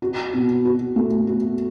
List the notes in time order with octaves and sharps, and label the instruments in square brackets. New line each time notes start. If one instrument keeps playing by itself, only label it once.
[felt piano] F#4
B2
F#4
A3
F#4